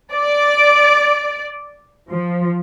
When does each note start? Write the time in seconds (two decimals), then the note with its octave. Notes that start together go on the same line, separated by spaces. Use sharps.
0.13 D5
2.09 F3